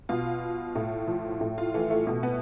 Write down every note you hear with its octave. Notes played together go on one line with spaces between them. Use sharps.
B2 F4
A2
F3
A2
F4
E3 A3
A3
B2 A3
B3